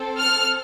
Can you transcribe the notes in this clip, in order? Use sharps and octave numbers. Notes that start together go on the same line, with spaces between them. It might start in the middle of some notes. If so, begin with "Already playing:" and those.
Already playing: C4 A4
F6